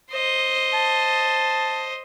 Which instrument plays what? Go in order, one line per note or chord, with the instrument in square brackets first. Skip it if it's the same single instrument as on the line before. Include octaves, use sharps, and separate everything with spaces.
[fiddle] C5 D#5
[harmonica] A5